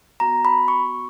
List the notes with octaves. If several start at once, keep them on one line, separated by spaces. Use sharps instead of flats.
B3 F#4 A#5
B5
C#6